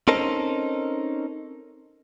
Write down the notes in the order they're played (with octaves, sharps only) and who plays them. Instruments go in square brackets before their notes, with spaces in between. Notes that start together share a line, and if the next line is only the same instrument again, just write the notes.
[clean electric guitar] C4 C#4 D#4 A4 A#4 C5